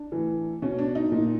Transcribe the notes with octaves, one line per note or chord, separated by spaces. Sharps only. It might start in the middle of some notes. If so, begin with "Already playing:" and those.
Already playing: D4
A2 E3
B2 C#4
D4
D#4
A#2